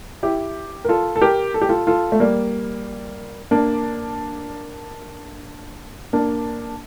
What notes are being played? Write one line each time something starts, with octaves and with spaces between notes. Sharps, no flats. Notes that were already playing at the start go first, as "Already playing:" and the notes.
E4 G4
A#4
F4 A4
A4
G4 A#4
A4
G4
F4 A4
F4 A4
A3
G3 A#3
A#3 D4
A#3 D4